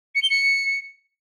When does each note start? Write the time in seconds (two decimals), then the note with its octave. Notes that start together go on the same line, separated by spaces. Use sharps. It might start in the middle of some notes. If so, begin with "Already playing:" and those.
0.15 C#7
0.22 G7
0.30 C#7